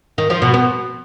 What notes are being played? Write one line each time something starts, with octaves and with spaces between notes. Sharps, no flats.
D#3
F3
B2
B3